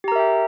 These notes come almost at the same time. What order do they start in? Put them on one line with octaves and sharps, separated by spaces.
G4 A#5 A#4 E5 G5